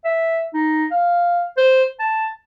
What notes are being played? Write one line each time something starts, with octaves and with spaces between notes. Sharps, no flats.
E5
D#4
F5
C5
A5